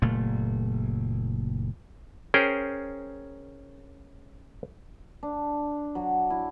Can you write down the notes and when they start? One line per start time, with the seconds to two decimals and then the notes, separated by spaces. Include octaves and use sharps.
0.02 F#1 A#2 A3
2.34 C#4 G#4 A#4 C5 G5
5.23 D4
5.95 F#3
6.30 E4